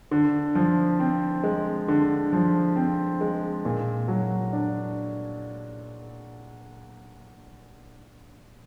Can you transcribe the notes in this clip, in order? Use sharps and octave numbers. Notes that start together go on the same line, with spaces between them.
D3
F3
C4
G#3
D3
F3
C4
G#3
A#2
F#3
D4